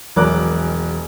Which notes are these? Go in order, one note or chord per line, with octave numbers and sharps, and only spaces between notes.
E1 A#1 F#3 A#4 D6 F#6